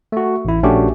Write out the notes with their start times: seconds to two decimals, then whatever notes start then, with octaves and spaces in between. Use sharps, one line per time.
0.12 A3 F#4
0.45 A1 E4
0.63 A#1 A3 C#4 D4 F#4 G4